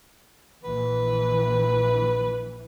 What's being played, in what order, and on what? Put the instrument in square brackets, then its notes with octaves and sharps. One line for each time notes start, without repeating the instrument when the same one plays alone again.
[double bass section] A#1 E3 [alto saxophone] B4